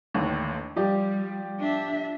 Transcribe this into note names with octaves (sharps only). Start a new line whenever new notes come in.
A1 D#2 D3
F3 G3 G4 D5
D4 E5